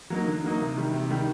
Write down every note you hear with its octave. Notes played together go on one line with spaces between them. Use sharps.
F#3 A#3 D#4
D3
F#3 A#3 D#4
C3
D#3 G3
C3
D#3 G3